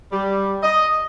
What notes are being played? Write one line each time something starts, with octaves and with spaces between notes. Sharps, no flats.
G3
D#5